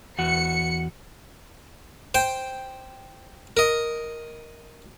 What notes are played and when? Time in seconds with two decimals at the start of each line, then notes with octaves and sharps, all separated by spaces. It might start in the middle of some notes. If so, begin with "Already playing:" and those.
0.19 E2 F#4 C#7
2.14 C5 G5
3.57 A#4 D#5